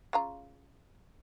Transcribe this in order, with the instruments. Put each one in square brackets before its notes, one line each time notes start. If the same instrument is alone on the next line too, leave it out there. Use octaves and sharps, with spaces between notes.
[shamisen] C#3 F4 A#5